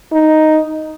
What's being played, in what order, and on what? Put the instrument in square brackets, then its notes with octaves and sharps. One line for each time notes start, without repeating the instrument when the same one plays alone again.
[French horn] D#4